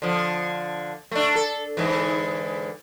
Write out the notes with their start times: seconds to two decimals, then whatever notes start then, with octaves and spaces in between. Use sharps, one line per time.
0.02 D3 F3
1.11 A3 D4
1.35 A4
1.77 G#2 D3 E3